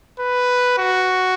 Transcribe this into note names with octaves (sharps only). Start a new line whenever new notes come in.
B4
F#4